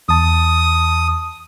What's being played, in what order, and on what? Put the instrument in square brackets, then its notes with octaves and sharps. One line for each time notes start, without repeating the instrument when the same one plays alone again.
[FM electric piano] E2 A5 [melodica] D#6